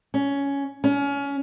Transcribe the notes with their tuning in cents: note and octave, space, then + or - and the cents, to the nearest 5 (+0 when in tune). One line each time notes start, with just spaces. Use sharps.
C#4 +10
C#4 +25